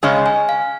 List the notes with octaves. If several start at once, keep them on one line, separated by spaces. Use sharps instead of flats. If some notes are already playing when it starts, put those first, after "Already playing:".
C#3 G#3 C#4 D#5
G#5
F5